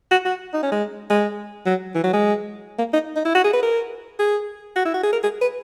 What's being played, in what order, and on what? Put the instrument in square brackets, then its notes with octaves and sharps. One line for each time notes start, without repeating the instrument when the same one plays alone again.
[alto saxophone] F#4
F#4
D#4
C#4
G#3
G#3
F#3
E3
F#3
G#3
A#3
D#4
D#4
E4
F#4
G#4
B4
A#4
G#4
F#4
E4
F#4
G#4
A#4
G#4
B4